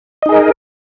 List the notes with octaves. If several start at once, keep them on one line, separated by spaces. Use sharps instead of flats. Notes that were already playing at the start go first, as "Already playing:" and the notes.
D#4 G#4 A#4 D#5